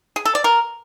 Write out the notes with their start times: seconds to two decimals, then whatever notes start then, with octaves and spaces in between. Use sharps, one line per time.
0.16 G#4
0.25 A4
0.35 D5
0.44 A#4